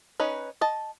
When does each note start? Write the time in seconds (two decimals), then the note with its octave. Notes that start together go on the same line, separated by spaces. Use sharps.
0.20 C#4 D#4 B4
0.61 D#5 A5